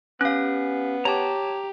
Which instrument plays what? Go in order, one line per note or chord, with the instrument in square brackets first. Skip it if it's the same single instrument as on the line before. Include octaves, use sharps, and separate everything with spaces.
[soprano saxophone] B3 [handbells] C#4 F5 [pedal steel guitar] G4 F#6
[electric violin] G4 [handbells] C#5 A5 [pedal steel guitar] A#5 D6